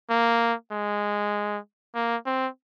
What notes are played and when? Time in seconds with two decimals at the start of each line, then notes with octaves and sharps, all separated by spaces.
0.10 A#3
0.72 G#3
1.95 A#3
2.26 C4